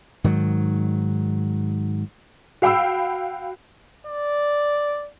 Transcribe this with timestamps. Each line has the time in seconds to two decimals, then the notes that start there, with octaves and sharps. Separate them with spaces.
0.24 G#2 D#3 F#3
2.62 F#4 F5 G5 B5 E6
4.07 D5